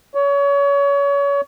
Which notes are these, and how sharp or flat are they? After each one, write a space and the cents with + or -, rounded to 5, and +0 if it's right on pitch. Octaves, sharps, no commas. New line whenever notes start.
C#5 +30